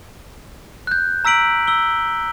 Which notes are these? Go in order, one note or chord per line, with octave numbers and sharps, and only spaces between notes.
F#6 G6
A#5 E6 B6 D7 F#7
E6 G7